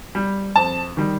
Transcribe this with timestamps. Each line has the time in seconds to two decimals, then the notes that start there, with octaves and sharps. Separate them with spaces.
0.15 G3
0.56 F2 A5
0.97 D#3 G3